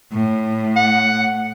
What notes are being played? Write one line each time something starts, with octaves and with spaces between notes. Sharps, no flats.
A2
F#5